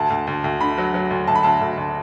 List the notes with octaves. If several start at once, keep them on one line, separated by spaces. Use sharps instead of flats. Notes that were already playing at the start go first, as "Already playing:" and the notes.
Already playing: D2 A5
D2
D2
D2
D3 B5
F#3
F#3
D2
D2 A5
B5
D2 A5
D2
D2